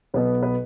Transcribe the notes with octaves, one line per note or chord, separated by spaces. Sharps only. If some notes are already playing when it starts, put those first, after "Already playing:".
B1 B2 B3 B4
B4